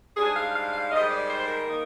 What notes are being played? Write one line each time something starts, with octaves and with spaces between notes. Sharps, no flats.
G#2 G3 D4 G#4
F5
F5
F5
G#2 D#3 G3 D#5
D5
C5
A#4
D#3 A#3 D#4